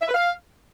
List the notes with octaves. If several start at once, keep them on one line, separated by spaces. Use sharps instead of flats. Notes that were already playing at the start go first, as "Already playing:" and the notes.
E5
B4
F5